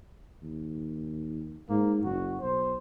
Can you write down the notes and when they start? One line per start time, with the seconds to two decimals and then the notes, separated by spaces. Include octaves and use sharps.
0.42 D#2
1.70 G#2 A#3
2.04 F#1 F#4
2.42 B1 C5